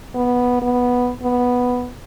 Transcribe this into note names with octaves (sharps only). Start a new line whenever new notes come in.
B3
B3
B3